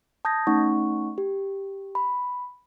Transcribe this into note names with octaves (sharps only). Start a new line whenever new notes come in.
A5 D#6 G6 G#6 A#6
A3 C#4 D#4 F#5 C#6
G4
B5